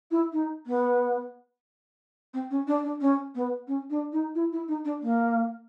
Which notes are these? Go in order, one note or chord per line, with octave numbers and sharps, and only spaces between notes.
E4
D#4
B3
C4
C#4
D4
D4
C#4
B3
C#4
D4
D#4
E4
E4
D#4
D4
A#3